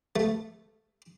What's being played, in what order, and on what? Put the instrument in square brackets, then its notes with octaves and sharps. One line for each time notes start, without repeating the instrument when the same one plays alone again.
[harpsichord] A3